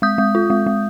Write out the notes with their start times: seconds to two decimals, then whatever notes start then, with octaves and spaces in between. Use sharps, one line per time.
0.02 G#3 D#6 G6
0.18 G#3
0.35 F4
0.50 G#3
0.66 G#3